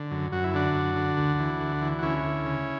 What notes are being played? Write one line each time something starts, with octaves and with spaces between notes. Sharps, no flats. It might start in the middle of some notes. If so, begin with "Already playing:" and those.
Already playing: D3
F#2
F#2 F#4
E4
D3 D4 F#4
F#2
D3
D2
E3
D2
E3
F#4
D2 C#4 E4
D2
C#3